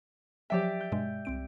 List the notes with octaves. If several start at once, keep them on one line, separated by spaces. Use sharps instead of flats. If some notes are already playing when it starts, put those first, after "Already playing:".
F3 F#3 G4 D5 E5 G5
G6
G2 B2 G#3
C2 C4 D7